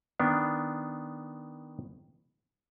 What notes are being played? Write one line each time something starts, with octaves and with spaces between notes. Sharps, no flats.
D#3 B3 D4